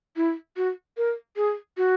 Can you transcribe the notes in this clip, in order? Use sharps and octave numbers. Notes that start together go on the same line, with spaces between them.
E4
F#4
A#4
G#4
F#4